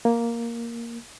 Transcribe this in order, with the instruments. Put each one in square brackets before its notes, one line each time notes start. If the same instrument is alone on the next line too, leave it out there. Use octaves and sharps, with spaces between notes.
[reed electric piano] A#3